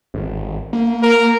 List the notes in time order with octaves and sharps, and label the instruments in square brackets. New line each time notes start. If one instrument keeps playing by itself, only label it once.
[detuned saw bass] G#1
A#3
[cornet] A#4